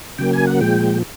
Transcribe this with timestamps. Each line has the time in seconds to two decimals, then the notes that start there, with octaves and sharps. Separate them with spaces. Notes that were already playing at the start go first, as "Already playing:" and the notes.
0.18 C#3 F#3 A#3 G5
0.33 G#5
0.47 F#5
0.61 A#2 F3 G#3 G5